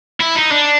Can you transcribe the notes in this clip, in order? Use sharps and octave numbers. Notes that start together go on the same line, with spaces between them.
E4
D#4
D4